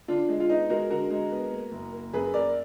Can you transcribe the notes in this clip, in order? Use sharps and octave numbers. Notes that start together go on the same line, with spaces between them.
D3 D4 F4
G#3
F4
B3 D#4
G#3 F#4 A#4
D3 F#4 A#4
G#3
B3
A#3
F#1
A#3
F#2 G#4 B4
A#3 A#4 D5